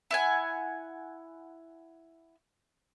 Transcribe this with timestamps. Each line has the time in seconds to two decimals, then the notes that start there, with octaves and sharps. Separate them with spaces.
0.11 E4 F#5 G#5